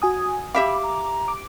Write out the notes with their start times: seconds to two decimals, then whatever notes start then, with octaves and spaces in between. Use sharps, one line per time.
0.02 F#4 G#5 D#6
0.54 G4 E5 F5 B5 D6
0.83 A#5
1.28 D6